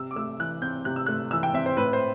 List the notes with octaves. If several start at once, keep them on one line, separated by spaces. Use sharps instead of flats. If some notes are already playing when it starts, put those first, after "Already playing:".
Already playing: C3 E6
D6
A3 E6
E3 F#6
C4 G6
C3 F#6
E6
A3 F#6
E3 E6
G5
C4 E5
C5
A2 B4
C5